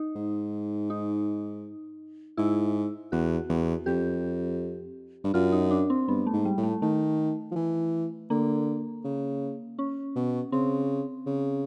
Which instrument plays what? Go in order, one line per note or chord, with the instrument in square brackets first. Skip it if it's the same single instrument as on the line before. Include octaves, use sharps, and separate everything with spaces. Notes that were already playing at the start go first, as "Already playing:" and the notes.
Already playing: [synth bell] D#4
[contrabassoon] G#2
[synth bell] D#4
[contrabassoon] G#2 [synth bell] E4
[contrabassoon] E2 [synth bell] F#4
[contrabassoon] E2
[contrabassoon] F2 [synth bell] G4
[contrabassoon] G2
[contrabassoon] F#2 [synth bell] F4
[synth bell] D#4
D4
C4
[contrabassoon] G2 [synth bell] B3
[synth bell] A3
[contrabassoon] G#2
[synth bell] G3
[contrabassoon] A2
[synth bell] A3
[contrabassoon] D#3 [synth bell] A3
[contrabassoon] F3
E3
[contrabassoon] D3 [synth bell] A#3
[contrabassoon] C#3
[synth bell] C#4
[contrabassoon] B2
[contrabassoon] C#3 [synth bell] C4
[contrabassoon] C#3